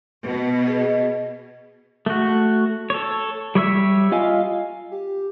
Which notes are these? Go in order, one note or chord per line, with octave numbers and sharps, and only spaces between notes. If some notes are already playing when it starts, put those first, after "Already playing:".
B2
G#4 D#5
A3 F#4
A4 C#5
G3 C#5 E5 E6
F4 D#5 F5 G#5
G4